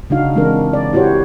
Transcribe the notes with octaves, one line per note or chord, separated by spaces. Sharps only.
C#3 D4 D#4 F#4 F5
E3 G#3 C4 D4 D#4 A#4
D5
E4 F#4 G4 C5 C#5